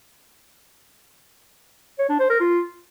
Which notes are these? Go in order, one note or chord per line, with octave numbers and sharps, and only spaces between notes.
C#5
D4
C5
A#4
F4